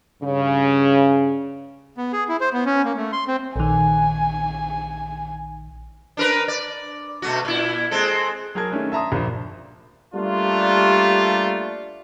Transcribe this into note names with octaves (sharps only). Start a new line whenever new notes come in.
G2 C#3
B3
G#4
E4
C5
B3
C#4
A#3
A3
C6
C4
A#1 D#3 G#5
D4 A#4 B4
D5
B2 A3 F#4
A#2 E4
G#3 C4 A4
F#3 G#4 A#4 A5 G#6
D#3 A3 C#4 D4
E5 A5 A#5 C6 D#6
A#1 F3
G3 A3 A#3 D4 F4